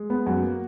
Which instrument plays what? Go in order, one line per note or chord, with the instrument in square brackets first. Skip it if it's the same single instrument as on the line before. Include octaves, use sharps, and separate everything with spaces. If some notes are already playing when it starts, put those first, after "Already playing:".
Already playing: [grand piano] G#3
B3
F#2 F#4
A#3